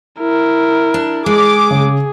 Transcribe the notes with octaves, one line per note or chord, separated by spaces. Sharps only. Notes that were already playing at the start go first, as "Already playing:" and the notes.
E4 A#4
D4
G#3 G#4 D6
C#3